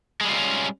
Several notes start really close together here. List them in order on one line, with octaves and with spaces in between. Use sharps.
G#3 G3 F4 C4 C#4